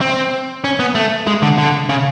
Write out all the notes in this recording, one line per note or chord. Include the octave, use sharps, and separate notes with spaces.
C4
C#4
B3
A3
G#3
D3
D3
C#3